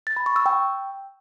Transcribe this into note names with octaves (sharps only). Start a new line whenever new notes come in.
A6
B5
C#6
E6
G5